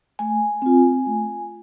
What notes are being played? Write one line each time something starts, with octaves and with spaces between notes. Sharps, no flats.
A3 G#5
C4 F4
A3